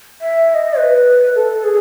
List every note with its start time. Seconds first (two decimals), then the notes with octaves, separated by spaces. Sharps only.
0.21 E5
0.50 E5
0.54 D#5
0.78 B4
1.35 A4
1.64 G#4